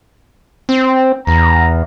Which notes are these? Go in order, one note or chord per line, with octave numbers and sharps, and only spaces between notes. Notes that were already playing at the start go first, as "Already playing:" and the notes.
C4
E2 A#5